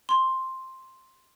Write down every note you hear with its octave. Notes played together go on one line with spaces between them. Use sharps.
C6